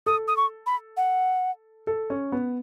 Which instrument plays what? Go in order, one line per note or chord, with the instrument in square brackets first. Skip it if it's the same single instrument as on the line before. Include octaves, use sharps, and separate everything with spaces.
[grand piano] A4 [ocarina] D#6
[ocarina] D#6
C#6
B5
F#5
[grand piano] A4
C#4
B3